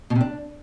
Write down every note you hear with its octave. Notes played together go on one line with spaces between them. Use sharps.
B2
C3
D4